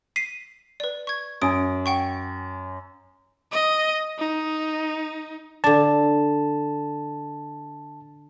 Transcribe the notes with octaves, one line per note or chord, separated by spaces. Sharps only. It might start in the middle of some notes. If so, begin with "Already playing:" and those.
B6 C7 D#7
B4 D5
C#6 G#6
F#2 G#5 D#6 D7
F#5 G5 C#6
D#5
D#4
D3 D4 A5